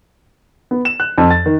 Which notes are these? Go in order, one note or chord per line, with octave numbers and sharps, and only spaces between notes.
B3
E7
F#6
F2
A6
D#3